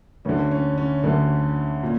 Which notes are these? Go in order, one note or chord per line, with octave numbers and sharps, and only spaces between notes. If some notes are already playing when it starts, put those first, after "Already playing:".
D2 D3 C#4
C#4
C#4
D2 D3 C#4
A#2